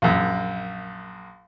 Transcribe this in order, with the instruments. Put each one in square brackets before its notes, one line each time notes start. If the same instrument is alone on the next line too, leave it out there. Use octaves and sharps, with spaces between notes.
[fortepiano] A#1 F#2